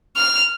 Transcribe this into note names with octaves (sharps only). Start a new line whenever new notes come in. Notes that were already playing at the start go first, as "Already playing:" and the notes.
F6